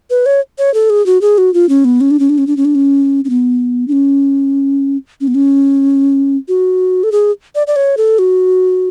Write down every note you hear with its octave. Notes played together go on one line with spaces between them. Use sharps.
B4
C#5
C#5
A4
G#4
F#4
G#4
F#4
F4
C#4
B3
C#4
D4
C#4
D4
C#4
D4
C#4
D4
C#4
C#4
B3
D4
C#4
C#4
B3
C#4
F#4
A4
G#4
D5
D5
C#5
A4
F#4